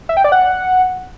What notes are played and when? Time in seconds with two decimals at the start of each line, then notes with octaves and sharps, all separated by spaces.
0.09 E5
0.17 G5
0.24 D5
0.32 F#5